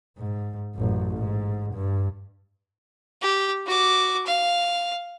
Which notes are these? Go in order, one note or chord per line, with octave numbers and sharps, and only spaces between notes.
G#2
A1 F#2
G#2
G2
G4
F#4 D6
F5